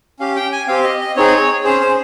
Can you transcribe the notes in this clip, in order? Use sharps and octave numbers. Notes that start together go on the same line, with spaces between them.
C#4 G4 F5
G5
G#5
C4 G4 F5
D#5
D#5
C4 D#4 G#4 C#5
C#4 G#4 C5
C5